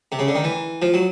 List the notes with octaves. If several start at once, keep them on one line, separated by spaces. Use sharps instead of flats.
C3
C#3
D3
D#3
E3
F3
F#3